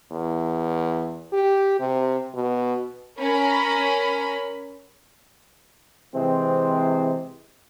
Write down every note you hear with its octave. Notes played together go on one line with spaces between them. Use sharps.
E2
G4
C3
B2
C#4 A#4 B5
C3 E3 G#3 C4